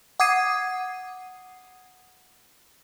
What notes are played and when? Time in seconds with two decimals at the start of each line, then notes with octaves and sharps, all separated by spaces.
0.20 F#5 D6 D#6 G#6 C7 D#7